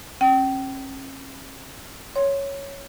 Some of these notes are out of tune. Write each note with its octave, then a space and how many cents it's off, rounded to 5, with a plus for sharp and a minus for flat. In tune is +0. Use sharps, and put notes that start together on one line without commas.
C#4 -40 G5 -30
C#5 +0 C6 +10